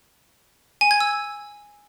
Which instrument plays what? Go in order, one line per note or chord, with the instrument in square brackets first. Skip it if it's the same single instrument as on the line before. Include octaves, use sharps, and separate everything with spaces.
[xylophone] G#5
G#6
E6